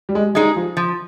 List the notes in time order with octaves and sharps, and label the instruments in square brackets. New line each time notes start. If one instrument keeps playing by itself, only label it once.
[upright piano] G3
G#3
[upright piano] G3 [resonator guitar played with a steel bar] G#3 D#4 G#4
[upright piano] F3
[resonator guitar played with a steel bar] F3